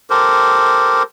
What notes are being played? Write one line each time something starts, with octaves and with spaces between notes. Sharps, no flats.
G4 A4 A#4 C5